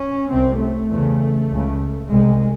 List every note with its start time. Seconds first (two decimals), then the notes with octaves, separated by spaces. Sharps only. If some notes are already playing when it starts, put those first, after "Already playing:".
Already playing: C#4
0.30 C2 C3 C4
0.60 A3
0.90 E2 C#3
1.50 C#2 C#3
2.10 C2 C3 G#3